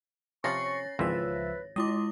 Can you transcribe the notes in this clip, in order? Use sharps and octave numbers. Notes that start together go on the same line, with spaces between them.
C3 F3 C#4 C#5 C#6 A6 A#6 C7
G#1 C#2 E3 F3 C4 B4 E5
G#3 E4 F4 D#5 D6